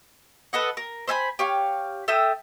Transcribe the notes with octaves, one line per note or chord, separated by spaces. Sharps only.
A4 B4 D#5 F#5
A#4
C5 E5 G#5 B5
G4 C#5 F5
A4 E5 G5 D#6